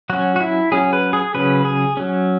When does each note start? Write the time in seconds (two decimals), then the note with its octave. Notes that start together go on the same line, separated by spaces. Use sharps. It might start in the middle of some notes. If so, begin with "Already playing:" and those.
0.10 F#3 C#4 F#4
0.36 F#4
0.40 E4
0.72 F#3 C#4 G#4
0.93 B4
1.13 G#4
1.35 C#3 F#3 C#4 B4
1.65 G#4
1.97 F#3 C#4